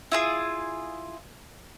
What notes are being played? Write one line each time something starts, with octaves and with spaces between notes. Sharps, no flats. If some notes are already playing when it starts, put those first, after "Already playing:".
E4 F4 G#4